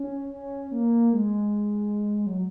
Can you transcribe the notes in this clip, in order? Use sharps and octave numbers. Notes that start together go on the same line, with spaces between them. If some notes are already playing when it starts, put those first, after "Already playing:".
Already playing: C#4
C#4
A#3
G#3
F#3